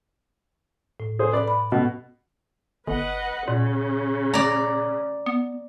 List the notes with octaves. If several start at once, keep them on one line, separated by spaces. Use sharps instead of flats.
A2
G#4 C5
B4 D5
B5
B2
G1 B4 D#5 F#5
A#2 C#3
D5 A#5
B3